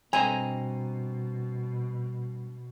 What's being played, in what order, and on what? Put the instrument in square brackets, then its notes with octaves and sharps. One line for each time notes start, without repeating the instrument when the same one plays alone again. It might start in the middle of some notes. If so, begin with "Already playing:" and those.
[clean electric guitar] G2 D#5 A#5 [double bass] B2 [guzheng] C4 [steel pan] G#5